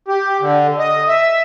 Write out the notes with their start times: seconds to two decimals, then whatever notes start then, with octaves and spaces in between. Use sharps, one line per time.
0.08 G4
0.41 D3
0.79 D#5
1.08 E5